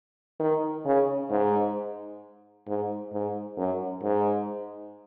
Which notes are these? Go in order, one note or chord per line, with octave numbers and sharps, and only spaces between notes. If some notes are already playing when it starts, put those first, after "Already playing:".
D#3
C#3
G#2
G#2
G#2
F#2
G#2